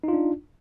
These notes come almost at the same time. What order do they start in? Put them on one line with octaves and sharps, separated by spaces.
D#4 F4 D4